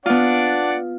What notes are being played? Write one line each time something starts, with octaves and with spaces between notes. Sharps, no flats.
B3 D4 F4 D5 F#5